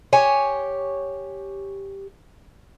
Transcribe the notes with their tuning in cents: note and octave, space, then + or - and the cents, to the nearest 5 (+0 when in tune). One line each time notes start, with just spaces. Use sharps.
G4 +0 C#5 +0 G#5 +0